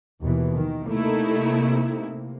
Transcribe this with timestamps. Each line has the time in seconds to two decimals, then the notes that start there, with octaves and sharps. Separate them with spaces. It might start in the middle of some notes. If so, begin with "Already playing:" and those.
0.22 D#2 B2 E3
0.54 D#3
0.89 C3 A3 A#3 D#4 E4